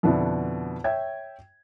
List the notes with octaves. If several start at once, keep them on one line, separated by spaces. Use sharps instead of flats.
F2 B2 D3 D4 E4
C#5 E5 G5 G#6